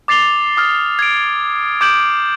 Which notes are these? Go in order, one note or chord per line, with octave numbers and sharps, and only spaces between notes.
D6 A6 C7 F7 G7
D#6 F6 A6
G#6 D7
D6 G6 G#6 D7 E7 F#7